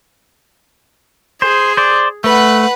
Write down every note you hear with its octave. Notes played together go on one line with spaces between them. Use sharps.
G#4 C5
C5 D5
A3 B4 F#5